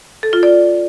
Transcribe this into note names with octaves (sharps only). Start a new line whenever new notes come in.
A4
F4
D5